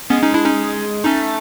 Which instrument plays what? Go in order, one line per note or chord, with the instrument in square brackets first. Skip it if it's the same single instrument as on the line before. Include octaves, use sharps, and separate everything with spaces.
[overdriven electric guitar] G#3 [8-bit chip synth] B3 C#4
[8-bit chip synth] C#4 D#4
D4 E4
C#4 D#4
[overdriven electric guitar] A3 [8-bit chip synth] C#4 D#4